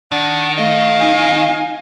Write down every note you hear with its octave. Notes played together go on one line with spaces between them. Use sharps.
D#3 D4 F#5
A3 D#5 F5
D#4 G#5